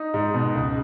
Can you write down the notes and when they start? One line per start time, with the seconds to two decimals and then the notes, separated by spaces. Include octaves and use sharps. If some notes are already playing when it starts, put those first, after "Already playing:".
Already playing: D#4
0.14 G#2
0.34 B2
0.55 C#2